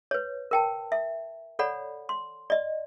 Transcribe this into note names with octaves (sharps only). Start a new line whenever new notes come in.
B4 C#5
A#4 G5 A5
E5
A4 C#5 D5 F#5 B5
C6
D5 D#5